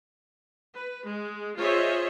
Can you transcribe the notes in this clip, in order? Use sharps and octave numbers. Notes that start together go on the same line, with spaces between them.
B4
G#3
F4 G#4 C5 C#5 D#5 E5